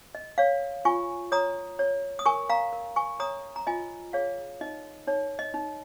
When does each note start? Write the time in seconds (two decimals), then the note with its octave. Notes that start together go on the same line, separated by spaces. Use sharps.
0.15 D#5
0.38 C#5 F5
0.85 F4 G#5 C#6
1.32 C#5 A#5 D#6
1.79 C#5
2.19 D#6
2.26 A#4 G#5 C#6
2.50 F5 A#5
2.73 A#4
2.96 G#5 C#6
3.20 C#5 A#5 D#6
3.56 A#5
3.67 F4 D#5 G#5
4.13 G#4 C#5 F5
4.61 D#4 D#5
5.07 D#4 C#5
5.39 D#5
5.54 D#4